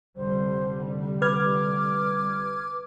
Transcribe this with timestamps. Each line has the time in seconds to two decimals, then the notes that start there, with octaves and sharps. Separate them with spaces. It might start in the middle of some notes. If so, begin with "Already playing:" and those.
0.17 F1 D3 G3 C5
1.22 B4 D6 F6 G#6